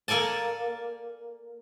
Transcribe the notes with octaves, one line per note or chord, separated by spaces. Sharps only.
A#3 A4 D5 G#5 A5